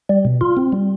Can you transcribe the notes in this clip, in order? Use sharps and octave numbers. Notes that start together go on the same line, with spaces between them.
G3
B2
F4
C4
G3